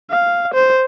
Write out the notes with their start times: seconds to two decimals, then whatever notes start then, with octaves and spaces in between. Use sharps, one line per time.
0.10 F5
0.54 C5